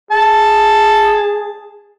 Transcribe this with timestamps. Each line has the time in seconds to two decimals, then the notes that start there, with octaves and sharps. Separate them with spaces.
0.11 G#4 A5